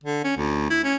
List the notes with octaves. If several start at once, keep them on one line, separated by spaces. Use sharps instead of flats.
D3
C#4
D2
E4
C#4